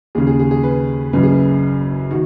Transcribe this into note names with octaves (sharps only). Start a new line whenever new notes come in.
D#2 C#3 G#4
G#4
G#4
G#4
B4
F#1 F#2 C#3 B4
G#4
B4
D#3 F#4